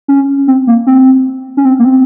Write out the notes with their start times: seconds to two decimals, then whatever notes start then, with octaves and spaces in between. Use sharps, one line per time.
0.08 C#4
0.47 C4
0.67 A#3
0.87 C4
1.57 C#4
1.65 C4
1.79 A#3
1.84 C4